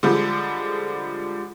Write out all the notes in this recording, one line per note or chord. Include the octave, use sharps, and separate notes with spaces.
D3 F3 G3 G#3